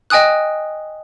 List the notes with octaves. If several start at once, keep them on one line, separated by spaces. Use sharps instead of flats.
D#5 G5 G#5 D#6 F#6